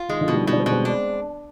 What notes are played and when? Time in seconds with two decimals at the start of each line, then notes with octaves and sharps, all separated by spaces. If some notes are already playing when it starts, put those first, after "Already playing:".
Already playing: F4
0.09 D#3 G#3
0.21 D3 F3
0.28 B2
0.34 D#3 G3
0.47 B2 F3 G#3
0.53 D4
0.59 G#3 C4
0.66 B2
0.72 G#3 C4
0.85 D4